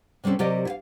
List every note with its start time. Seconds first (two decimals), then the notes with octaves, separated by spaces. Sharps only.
0.24 C3 G3 C4 C#4 A4
0.39 C3 F#3 G4 A#4 D5 D#5
0.65 E4 F5